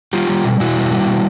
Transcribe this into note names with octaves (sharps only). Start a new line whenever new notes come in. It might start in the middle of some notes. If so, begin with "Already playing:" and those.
G3 F4 G4
G3
B2
B2 E4 F#4
G3
G3
B2